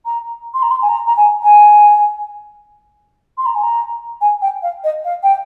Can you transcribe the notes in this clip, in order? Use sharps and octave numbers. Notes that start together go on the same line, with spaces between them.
A#5
C6
A#5
C6
G#5
A#5
A#5
G#5
G#5
C6
A#5
G#5
A#5
G#5
G5
F5
D#5
F5
G5